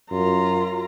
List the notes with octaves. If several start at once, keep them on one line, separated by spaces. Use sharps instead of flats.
F#2 F4 A#5